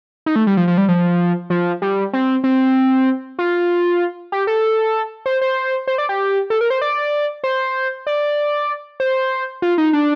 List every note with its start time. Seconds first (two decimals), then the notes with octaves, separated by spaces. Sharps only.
0.26 D#4
0.36 A3
0.47 G3
0.57 F3
0.68 F3
0.78 G3
0.89 F3
1.50 F3
1.82 G3
2.13 C4
2.44 C4
3.39 F4
4.32 G4
4.47 A4
5.26 C5
5.41 C5
5.88 C5
5.98 D5
6.09 G4
6.50 A4
6.61 A#4
6.70 C5
6.82 D5
7.44 C5
8.07 D5
9.00 C5
9.62 F4
9.78 D#4
9.93 D4